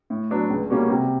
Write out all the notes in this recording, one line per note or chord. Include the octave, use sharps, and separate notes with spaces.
A2
F#3 B3 D4
C#2
B2 G3 A#3 C#4
C3